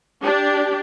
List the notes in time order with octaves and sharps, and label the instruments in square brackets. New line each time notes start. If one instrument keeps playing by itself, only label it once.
[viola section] D4 G4